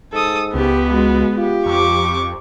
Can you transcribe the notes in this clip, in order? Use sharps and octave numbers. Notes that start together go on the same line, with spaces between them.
G#2 A4 D#6
C#2 B3 G4
G#3 F#4
F4 G4
F2 C#6 D6